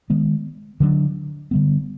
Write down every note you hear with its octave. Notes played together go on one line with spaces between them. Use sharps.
D#3 G#3 B3
D3 F#3 A3 D4
D3 G3 B3